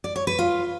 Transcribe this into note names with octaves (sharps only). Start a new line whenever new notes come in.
D5
C#5
B4
F4